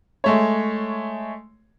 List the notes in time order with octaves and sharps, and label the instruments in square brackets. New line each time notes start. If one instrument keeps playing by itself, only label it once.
[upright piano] G#3 A3 C#5